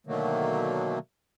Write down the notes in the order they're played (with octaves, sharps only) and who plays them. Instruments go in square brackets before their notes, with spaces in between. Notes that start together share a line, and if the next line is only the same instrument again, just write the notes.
[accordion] B2 D3 D#3 F#3 A3 A#3